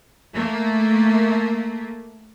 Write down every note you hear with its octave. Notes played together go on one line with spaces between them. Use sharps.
A3 A#3